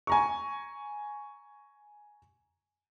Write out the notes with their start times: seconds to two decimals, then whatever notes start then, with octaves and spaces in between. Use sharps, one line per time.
0.07 G#5 A#5 C#6